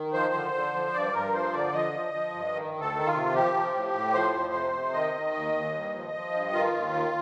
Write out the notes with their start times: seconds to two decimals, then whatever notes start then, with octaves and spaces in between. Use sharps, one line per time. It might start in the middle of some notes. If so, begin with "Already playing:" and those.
Already playing: D#3
0.13 F3 C5
0.33 D3
0.54 D3
0.73 F3
0.94 G2 D5
1.13 G2 A#4
1.34 F3 C5
1.53 D3 D5
1.73 F3 D#5
1.93 F3
2.14 F3
2.34 G2
2.54 D#3
2.74 D2
2.80 A4
2.94 D#3
3.06 F4
3.13 C3
3.34 F3 G4
3.54 F3
3.74 A2
3.93 A2
4.14 F3 C5
4.33 F2
4.54 C3
4.74 C3
4.93 D#3 D#5
5.14 D#3
5.34 D#2
5.53 D#2
5.74 G2
5.94 F3
6.14 F3
6.34 G2
6.53 D#3 F4
6.74 D#2
6.94 D#3